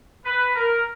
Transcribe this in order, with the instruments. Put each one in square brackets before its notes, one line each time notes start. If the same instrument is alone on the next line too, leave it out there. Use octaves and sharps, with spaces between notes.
[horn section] B4
A#4